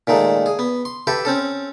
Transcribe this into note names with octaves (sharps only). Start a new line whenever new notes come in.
A#2 D#3 G#3 A3
G#4
B3
C6
G4 A4 B4 E5
C4 C#4 A4